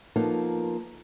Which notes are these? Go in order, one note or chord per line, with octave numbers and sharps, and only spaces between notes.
F3 A#3 B3 D#4 F4 A4